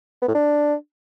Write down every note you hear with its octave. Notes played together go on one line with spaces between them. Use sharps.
B3
A2
D4